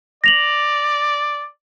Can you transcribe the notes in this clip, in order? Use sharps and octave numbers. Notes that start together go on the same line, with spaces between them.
D5 A#6 F7 F#7